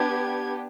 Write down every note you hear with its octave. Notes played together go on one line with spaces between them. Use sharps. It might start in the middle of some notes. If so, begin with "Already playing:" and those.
Already playing: B3 D4 G4 G#6